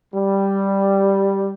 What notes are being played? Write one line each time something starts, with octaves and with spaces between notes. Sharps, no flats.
G3